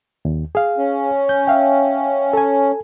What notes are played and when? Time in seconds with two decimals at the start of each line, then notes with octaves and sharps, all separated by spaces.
0.25 D#2
0.55 G#4 F5
0.78 C#4
1.29 G6
1.47 E5 F5 G5
2.33 A4 G#5